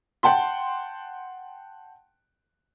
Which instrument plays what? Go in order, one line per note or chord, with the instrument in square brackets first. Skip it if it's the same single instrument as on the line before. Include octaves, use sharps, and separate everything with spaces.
[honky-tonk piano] F#5 G5 A5 C6